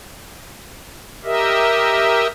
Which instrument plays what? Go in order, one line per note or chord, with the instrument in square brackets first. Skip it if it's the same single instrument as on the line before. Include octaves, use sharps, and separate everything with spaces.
[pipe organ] G4 A#4 D#5 E5